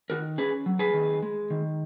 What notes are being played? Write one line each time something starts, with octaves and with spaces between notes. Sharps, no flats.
D#3 F#4 A#4
C#4 G#4 B4
F#3
G#4 B4
D#3
G#3
D#3